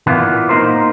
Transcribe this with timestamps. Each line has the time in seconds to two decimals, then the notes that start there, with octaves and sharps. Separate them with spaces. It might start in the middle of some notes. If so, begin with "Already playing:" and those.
0.07 A#2 E3 A#3 B3
0.49 A#3 D#4 A#4 C5